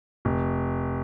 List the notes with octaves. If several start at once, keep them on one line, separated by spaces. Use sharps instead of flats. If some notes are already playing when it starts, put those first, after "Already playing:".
F1